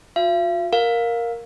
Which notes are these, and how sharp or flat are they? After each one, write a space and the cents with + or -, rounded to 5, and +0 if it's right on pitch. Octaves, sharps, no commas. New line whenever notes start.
F4 +45 F5 -45
A#4 +0 F5 +15